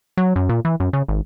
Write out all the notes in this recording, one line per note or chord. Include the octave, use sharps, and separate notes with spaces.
F#3
F#2
A#2
E3
F#2
C#3
G#1